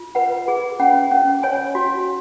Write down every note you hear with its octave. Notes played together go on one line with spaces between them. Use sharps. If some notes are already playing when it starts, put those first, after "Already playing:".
Already playing: F4
B4 F#5
G#4
C#4 F#5
C#4
C#5 G#5
F#4